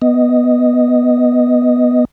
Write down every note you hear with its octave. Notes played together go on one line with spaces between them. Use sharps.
B3 D#5